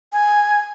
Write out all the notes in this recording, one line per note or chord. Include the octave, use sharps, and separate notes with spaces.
G#5